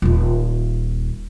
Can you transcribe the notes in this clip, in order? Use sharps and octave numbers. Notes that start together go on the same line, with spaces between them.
D#1 F4